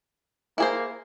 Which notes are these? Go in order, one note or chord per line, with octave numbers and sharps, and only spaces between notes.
A#3 E4 G#4 C5